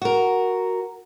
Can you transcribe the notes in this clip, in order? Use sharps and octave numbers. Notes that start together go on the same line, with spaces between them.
F#4 A#4